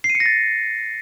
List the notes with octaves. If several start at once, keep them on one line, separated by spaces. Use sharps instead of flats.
C7
D#7
C#7
A#6
A6